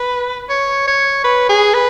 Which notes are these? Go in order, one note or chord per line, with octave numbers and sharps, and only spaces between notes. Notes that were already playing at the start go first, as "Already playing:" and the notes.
Already playing: B4
C#5
C#5
B4
G#4
B4